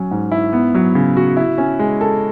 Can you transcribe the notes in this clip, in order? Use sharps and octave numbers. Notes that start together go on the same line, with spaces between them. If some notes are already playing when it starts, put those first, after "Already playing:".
Already playing: F#3 C#4
G#2
E4
B3
F#3
C#3
F#4
E4
C#4
G#3
A4